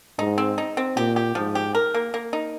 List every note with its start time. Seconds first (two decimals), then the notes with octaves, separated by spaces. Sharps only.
0.19 G#2 D#4
0.38 C4
0.58 D#4
0.77 C4
0.96 A#2 G4
1.16 G4
1.35 G#2 F3
1.55 G4
1.75 A#4
1.94 A#3
2.14 A#3
2.33 D#4